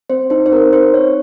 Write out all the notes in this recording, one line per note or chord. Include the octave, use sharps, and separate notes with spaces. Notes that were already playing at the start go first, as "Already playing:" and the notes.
C4 C5
D#4 C5
C5
C4 A#4
D#4 C5
C4 C#5